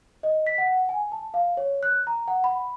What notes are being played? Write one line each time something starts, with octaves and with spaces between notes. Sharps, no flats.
D#5
B6
F#5
G#5
A5
F5
C#5
F#6
A#5
F#5
B5